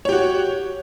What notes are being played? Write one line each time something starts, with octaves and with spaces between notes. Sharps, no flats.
F#4 G4 C#5